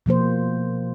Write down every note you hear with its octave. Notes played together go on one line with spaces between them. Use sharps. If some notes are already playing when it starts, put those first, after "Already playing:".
B2 F3 A#3 C5